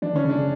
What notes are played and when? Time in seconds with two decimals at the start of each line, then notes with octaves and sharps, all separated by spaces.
0.02 E3 D4
0.13 D3 C#4
0.25 C#3
0.30 D4
0.36 C#3